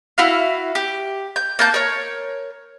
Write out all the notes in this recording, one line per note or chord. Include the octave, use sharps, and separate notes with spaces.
E4 F#4 F5
G4
G6
A#3 A5 G6
A#4 C#5